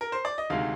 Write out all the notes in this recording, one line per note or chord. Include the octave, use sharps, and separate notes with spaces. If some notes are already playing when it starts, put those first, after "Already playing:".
A#4
C5
D5
D#5
D2 C3 D#3 G#3 F5